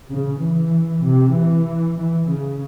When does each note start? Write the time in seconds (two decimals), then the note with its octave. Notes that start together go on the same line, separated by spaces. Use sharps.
0.10 C#3
0.41 E3
1.03 C3
1.34 E3
1.98 E3
2.28 C#3